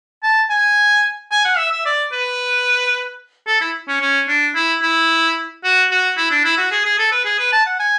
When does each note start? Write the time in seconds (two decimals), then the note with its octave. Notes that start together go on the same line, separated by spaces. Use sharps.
0.23 A5
0.50 G#5
1.31 G#5
1.45 F#5
1.57 E5
1.72 E5
1.85 D5
2.12 B4
3.47 A4
3.61 E4
3.88 C#4
4.01 C#4
4.28 D4
4.55 E4
4.82 E4
5.64 F#4
5.91 F#4
6.17 E4
6.31 D4
6.44 E4
6.57 F#4
6.71 G#4
6.85 G#4
6.98 A4
7.12 B4
7.25 G#4
7.39 B4
7.52 A5
7.66 F#5
7.79 G#5